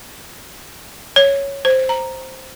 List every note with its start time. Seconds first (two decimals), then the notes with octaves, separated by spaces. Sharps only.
1.16 C#5
1.65 C5
1.89 A#5